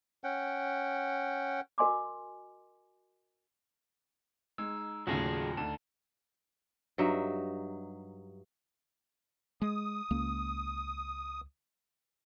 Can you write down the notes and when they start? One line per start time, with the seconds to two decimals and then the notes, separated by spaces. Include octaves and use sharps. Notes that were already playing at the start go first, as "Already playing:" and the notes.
0.24 C#4 F#5 G5
1.78 F#4 A#4 D#5 G#5 C6 D6
4.58 G#3 D#4 E6
5.07 D#2 A2 C#3 F#3 F4 G#4 A5 A#6
5.57 D2 D#4 A5
6.98 G2 F#3 D#4 E5
9.62 G#3 D#6
10.11 C#2 A#3